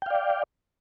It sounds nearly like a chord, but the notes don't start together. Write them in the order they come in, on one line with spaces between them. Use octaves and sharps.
G5 F5 D5